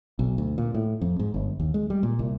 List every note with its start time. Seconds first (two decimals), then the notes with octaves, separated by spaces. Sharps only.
0.19 B1
0.38 D2
0.58 A#2
0.74 A2
1.01 F2
1.19 G#2
1.34 G1
1.60 D#2
1.74 G#3
1.90 G3
2.03 A#2
2.19 C2